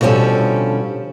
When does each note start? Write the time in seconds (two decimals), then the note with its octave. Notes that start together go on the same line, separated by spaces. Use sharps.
0.01 B2 D3 F3 G3 C#4 A4